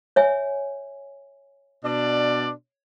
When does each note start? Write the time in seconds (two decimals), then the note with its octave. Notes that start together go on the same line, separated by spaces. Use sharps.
0.16 C#5 E5 G#5
1.83 B2 D4 D5